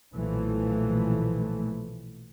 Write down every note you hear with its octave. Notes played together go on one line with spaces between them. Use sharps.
B1 A#2 E3 F3 A3